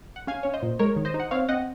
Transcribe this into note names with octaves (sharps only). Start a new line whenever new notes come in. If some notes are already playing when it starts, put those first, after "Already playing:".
F#5
C#4 F5 G#5
C#4 C#5
C5 D#5
A#2
G#3 A#4 C#5
D#3
C5 D#5
D#4
F#5
C4 C#5 F5
C4 D#5 F#5